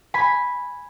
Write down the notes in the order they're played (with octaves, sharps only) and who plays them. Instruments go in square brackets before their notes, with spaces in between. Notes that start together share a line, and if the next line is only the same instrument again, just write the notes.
[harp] G#5 B5